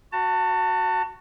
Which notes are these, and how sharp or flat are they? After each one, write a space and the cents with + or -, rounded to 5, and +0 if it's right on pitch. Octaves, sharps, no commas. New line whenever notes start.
F#4 +0 A5 +30